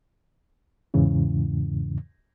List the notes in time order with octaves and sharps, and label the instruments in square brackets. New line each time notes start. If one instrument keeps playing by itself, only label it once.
[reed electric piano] E2 G#2 C#3 E3